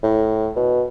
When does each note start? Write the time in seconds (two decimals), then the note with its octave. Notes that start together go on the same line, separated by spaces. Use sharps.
0.03 A2
0.56 B2